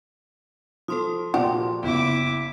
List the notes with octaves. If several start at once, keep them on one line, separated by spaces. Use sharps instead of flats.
F3 A4 C6 D#6
A#2 F3 F#4 G4 D5 C6
F#1 B3 E4 G5 D6